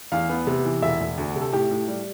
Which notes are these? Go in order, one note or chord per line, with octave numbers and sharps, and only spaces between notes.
E2 F5
B3
C3
E3
E1 E5
E1
D2
C3
A4
A2 G4
A2
G3